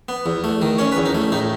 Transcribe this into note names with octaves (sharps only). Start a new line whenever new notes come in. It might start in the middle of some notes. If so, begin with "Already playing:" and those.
B3
E2
A3
D#3
C#4 C#5
B4
E2
D#4
A3
A2 D#4